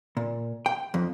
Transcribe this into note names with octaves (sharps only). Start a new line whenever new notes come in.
A#2
G5
F2